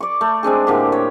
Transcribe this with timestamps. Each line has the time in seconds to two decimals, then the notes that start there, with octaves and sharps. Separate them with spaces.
0.01 D5 C#6
0.21 A3
0.43 G#3 C4 D4 G#4
0.67 A2 D3 A#3 G4
0.92 C#5